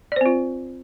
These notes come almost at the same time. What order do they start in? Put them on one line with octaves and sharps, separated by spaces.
D5 C5 C4 F4